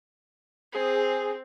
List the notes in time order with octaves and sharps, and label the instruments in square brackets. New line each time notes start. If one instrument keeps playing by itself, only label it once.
[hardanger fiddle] C4 [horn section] G#4